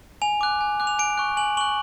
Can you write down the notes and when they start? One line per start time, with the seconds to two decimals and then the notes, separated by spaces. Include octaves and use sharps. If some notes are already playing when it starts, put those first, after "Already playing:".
0.22 G#5 F7
0.41 D6 F#6
0.61 G#5
0.80 D6 F#6
0.87 F7
0.99 G#5 D7
1.18 C#6 F#6
1.37 G#5 F#7
1.57 C#6 F#6 F#7